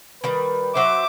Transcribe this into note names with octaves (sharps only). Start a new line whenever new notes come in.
D#3 G3 B4
F#3 C5 E5 D6